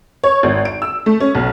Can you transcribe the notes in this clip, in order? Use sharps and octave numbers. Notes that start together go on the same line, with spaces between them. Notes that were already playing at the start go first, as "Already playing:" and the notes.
C#5
G#1
D7
E6
A3
C#4
B1